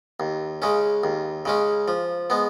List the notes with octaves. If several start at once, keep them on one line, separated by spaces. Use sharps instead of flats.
D#2
C#3 G#3 C#4
D#2
C#3 G#3 C#4
F3
G#3 B3